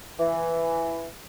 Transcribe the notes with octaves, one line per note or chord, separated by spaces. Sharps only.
E3